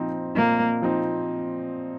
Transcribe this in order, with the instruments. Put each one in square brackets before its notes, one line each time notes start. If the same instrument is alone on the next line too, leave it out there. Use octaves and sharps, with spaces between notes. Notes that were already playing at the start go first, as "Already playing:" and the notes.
Already playing: [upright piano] A#2 F3 C4 D#4
[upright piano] A#2 [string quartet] A#3
[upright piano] F3 C4 D#4